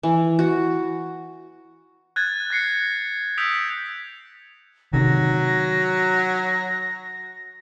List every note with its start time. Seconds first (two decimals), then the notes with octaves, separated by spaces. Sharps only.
0.03 E3
0.39 F#4
2.16 F#6 G#6 A6
2.50 F#6 A#6 C7 C#7
3.37 D#6 E6 G6 B6 D7 F7
4.93 C3 D#3 F#3 A#6